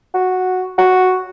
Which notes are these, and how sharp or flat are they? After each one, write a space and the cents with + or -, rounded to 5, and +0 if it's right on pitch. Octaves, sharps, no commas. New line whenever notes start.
F#4 -5
F#4 +0